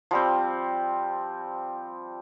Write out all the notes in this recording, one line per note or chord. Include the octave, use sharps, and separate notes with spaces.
F3 G3 C4